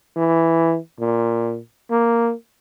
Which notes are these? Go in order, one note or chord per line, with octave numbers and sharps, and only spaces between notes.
E3
A#2
A#3